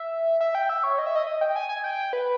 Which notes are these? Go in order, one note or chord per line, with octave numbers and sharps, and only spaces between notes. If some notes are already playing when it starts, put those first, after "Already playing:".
Already playing: E5
E5
G5
E5
C#5
D#5
E5
D#5
D#5
G5
G#5
G#5
G5
B4